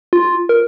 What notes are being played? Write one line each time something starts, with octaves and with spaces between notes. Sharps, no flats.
F4
A#4